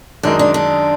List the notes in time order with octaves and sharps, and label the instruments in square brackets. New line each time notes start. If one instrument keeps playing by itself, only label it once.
[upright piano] F#2 D#3 G#3 D#4 A#4 [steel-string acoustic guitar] D4
[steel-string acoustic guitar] D4
D4